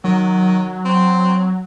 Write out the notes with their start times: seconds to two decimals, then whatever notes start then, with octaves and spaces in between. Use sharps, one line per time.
0.04 D#3 F#3
0.85 C4